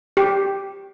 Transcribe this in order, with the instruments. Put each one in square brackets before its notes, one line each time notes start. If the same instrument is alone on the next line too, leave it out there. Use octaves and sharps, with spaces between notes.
[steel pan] G4